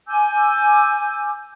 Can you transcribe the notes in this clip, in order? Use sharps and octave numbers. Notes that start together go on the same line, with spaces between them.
G#5 D6 E6 G6